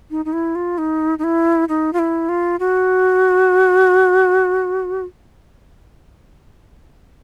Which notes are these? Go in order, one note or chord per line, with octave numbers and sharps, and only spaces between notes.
D#4
D#4
E4
F4
D#4
D#4
E4
D#4
F4
E4
F4
F#4